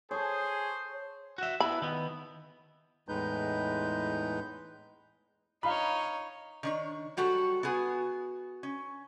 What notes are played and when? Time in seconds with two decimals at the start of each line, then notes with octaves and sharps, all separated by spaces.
0.11 G#4 A4 C5 C#5
1.38 F#4 E5
1.60 B3 E4 B5
1.82 D#3 B3
3.09 E2 A2 G#3 D#4 B4 G6
5.63 D#4 C#5 F5 B5
6.63 D#3 D4 C#5
7.17 F#3 G3 F#4 A4
7.63 B3 F#4 G#4
8.63 C#4